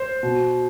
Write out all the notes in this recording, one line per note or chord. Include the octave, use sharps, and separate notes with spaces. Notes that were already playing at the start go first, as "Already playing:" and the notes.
Already playing: C5
B2